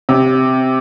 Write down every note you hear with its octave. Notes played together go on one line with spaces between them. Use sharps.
C3